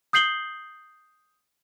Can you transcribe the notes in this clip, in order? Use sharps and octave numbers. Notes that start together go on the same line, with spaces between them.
D#6 G6 C7 F#7 G7